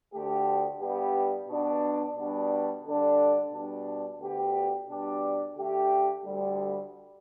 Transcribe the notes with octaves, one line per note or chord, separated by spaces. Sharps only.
D2 D3 A3 G4
G2 G3 B3 G4
B2 B3 D4
B2 G3 B3 D4
D3 G3 D4 A4
B2 G3 D4
D2 D3 B3 G4
B2 G3 D4 G4
D3 A3 G4
D2 D3 G3